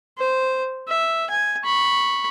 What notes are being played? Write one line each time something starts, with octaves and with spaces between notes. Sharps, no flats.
C5
E5
G#5
B5 C#6